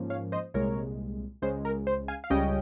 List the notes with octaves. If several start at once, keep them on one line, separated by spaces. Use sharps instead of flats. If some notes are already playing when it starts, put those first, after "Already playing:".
Already playing: G#2 F3 A#3 C#4
C#5 F5
C5 D#5
C2 A#2 G#3 A#4 C#5
C#2 C#3 G#3 C5
A#4
C5
F5 G#5
F5
C#2 C#3 G3 C#4 D#5 G5